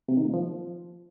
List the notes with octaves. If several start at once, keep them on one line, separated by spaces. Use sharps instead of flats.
C3
D#3
A#2
F3